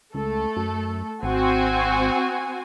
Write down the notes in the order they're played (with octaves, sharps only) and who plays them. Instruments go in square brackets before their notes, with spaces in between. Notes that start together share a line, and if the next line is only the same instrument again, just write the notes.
[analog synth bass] C#2 [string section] A3 A4
[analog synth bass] F#2
[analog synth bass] G#1 [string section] C4 F#4 G#5